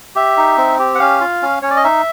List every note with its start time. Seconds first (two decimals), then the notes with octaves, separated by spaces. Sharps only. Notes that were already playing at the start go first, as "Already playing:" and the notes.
0.16 G4 E5
0.37 D#4
0.58 C4
0.79 G4
0.95 F#5
1.00 C#4 F5
1.21 F4
1.42 C#4
1.62 C#4 C#5
1.70 D5
1.76 D#5
1.84 D#4 E5